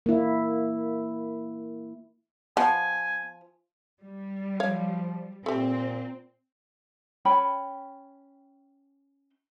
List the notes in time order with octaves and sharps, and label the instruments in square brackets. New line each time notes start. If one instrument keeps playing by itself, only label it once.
[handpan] A#3 E4
[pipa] F3 [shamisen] B3 [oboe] G#5
[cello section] G3
[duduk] F3 [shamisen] C#5 F5
[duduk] A#2 [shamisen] A3 G4 [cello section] C4
[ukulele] C#4 G5 B5